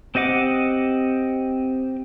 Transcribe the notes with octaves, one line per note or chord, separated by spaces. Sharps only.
C4 G4 D#5 F#5 D6